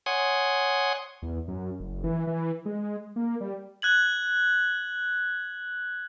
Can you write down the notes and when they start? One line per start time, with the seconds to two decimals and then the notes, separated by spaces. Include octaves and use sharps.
0.06 C#5 F#5 G#5 C6 D#6
1.22 E2
1.48 F#2
1.80 F#1
2.04 E3
2.27 E3
2.66 G#3
3.16 A#3
3.41 G3
3.82 F#6 G#6 F#7